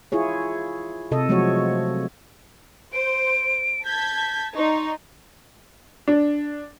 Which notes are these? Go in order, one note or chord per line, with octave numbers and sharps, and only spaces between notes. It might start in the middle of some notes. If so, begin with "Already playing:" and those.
E4 F4 G#4 C#5
C3 A4 D#5
F3 F#3 G#3 A3 F#4 C#5
C5 D7
A5 G6 G#6 B6
D#4 D5 C6 C#6
D4